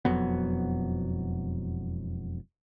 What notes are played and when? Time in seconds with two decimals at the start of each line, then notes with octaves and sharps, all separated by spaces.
0.05 E1 F2 F#3 B3